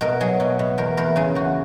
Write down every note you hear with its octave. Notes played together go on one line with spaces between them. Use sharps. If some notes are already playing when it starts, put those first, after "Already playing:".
B2 A#4
F#3 G#4
B2
B2
E2 A#4
E2 A#4
C#3 G#4
E2 F#4